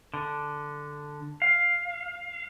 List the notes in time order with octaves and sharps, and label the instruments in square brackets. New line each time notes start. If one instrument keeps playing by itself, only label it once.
[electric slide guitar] D3
F5